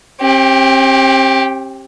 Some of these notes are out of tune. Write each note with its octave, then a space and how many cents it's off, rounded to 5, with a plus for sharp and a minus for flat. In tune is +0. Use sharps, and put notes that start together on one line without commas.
C4 +40 G4 +0